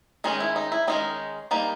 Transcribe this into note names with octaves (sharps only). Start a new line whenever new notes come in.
D#3 G#3 C#4 D#4
E4
D#4
E4
D#3 G#3 C#4 D#4
G3 A#3 D#4